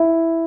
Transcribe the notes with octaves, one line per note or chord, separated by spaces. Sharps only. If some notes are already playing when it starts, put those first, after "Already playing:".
Already playing: E4